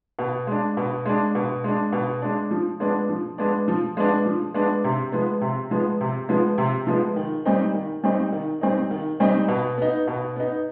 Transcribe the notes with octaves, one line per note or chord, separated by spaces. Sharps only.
B2
G#3 D4
B2
G#3 D4
B2
G#3 D4
B2
G#3 D4
F3
G#3 B3 D4
F3
G#3 B3 D4
F3
G#3 B3 D4
F3
G#3 B3 D4
C3
F3 G#3 B3
C3
F3 G#3 B3
C3
F3 G#3 B3
C3
F3 G#3 B3
D#3
G3 C4 D#4
D#3
G3 C4 D#4
D#3
G3 C4 D#4
D#3
G3 C4 D#4
B2
B3 D#4
B2
B3 D#4